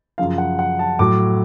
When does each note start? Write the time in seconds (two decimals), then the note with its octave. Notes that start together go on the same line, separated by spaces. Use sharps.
0.18 F#2 C#3 F3 F5
0.38 F#5
0.59 F#5
0.79 A5
0.99 A2 F#3 D6